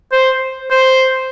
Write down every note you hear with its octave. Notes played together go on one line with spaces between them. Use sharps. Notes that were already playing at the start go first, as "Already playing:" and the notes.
C5
C5